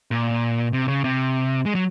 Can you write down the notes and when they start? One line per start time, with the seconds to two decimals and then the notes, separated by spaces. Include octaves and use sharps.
0.11 A#2
0.73 C3
0.88 C#3
1.04 C3
1.66 G#3
1.75 F#3